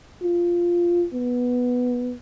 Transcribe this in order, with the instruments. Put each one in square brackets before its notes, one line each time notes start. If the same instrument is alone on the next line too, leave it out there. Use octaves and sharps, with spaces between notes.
[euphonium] F4
B3